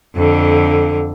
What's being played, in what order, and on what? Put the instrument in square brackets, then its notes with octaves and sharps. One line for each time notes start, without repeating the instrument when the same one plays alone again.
[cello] F2 D3